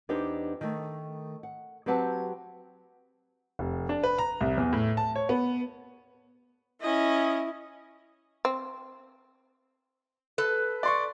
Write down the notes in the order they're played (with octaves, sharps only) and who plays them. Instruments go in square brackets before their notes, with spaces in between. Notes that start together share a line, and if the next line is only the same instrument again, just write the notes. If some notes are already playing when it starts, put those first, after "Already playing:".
[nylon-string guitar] E2 D4 D#4 G4 B4 C5
D#3 A3
F#5
F#3 C4 G4 B4 F#5 A5
[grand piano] F1
D4
B4
A#5
C2
E2
A2
A5
C#5
B3
[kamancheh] C#4 D#5 [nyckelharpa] E4
[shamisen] C4
[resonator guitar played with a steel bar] A4 B4
[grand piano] D5 C6 C#6